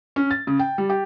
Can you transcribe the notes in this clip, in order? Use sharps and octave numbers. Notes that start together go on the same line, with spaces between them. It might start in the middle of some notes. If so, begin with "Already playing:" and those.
C#4
A6
C#3
G5
G3
G4